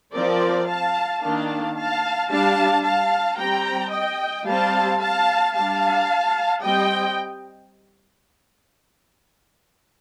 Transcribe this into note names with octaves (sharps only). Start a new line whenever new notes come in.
F3 C4 A#4 D5
F5 A5
D#3 A#3 D4 F5 A5
F5 A5
G3 D4 F5 A5
F5 A5
G3 C4 G5 A#5
D#5 G5
G3 C4 F5 A5
F5 A5
G3 D4 F5 A5
G3 C4 D#5 G5